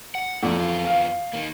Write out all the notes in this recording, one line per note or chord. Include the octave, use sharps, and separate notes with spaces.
F#5
F2 A#3 D5
E2 F4
F5
D#3 A#3